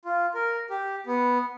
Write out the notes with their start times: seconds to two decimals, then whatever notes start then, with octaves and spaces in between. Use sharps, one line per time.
0.05 F4
0.34 A#4
0.70 G4
1.07 B3